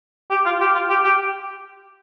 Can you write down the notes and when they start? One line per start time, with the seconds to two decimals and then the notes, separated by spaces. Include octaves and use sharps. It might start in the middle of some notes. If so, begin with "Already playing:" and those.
0.30 G4
0.45 F4
0.60 G4
0.74 F4
0.89 G4
1.04 G4